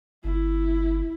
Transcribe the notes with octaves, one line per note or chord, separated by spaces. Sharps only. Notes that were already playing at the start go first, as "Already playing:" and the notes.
G1 E4